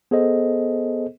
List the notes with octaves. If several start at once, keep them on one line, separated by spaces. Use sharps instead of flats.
B3 G#4 A4 C5 D#5